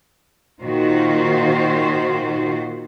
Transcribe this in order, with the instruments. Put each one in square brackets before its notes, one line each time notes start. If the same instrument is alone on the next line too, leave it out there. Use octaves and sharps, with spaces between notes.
[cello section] A#2 D#3 F4 F#4 C5